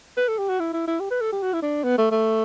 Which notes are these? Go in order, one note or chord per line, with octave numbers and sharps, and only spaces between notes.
B4
A4
G4
F#4
E4
E4
E4
G4
B4
A4
G4
F#4
E4
D4
B3
A3
A3